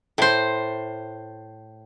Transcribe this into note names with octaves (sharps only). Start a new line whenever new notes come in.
A2 C5